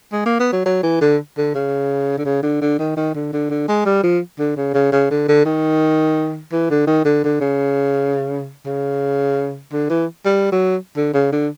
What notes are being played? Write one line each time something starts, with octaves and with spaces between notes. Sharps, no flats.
G#3
A#3
B3
F#3
F#3
E3
D3
D3
C#3
D3
C#3
D3
D3
D#3
D#3
D3
D3
D3
G#3
G3
F3
D3
C#3
C#3
C#3
D3
D3
D#3
E3
D3
D#3
D3
D3
C#3
C#3
D3
E3
G3
F#3
D3
C#3
D3